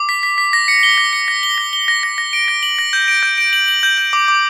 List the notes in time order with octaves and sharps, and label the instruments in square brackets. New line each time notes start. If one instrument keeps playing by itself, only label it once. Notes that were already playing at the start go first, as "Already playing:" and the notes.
Already playing: [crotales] D6
B6
B6
B6
A#6
C#7
G7
A#6
C#7
A#6
G7
A#6
G7
A#6
A#6
A#6
D7
A#6
F#7
A#6
G6
D7
G6
D7
F#7
F#7
G6
G6
D6
D6